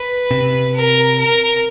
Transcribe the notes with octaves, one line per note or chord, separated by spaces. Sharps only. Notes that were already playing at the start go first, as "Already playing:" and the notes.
Already playing: B4
C3
A#4
A#4